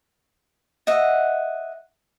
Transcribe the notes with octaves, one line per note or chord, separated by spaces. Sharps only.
D#5 E5 F#5